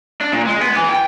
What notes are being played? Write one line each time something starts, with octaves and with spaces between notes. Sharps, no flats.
D4
A#2
G#3
B3
E3
G5